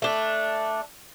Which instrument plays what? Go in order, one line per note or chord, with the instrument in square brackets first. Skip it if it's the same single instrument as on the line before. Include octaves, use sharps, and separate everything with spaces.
[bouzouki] A3 D4